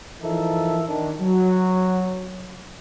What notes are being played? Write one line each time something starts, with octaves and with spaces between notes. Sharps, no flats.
E3 F3 D#4 A4 A#4 E5
D#3 D4
F#3